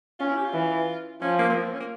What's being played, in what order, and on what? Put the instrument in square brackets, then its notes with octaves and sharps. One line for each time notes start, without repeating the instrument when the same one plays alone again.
[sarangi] C#4 [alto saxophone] F4
[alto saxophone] E4
G4
F4
[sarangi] E3
[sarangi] F3 [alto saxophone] C#4
[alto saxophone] A#3
C4
A#3
C4
C#4
A#3